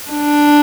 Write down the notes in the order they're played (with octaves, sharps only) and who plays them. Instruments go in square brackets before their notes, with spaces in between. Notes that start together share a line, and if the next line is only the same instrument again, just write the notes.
[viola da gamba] D4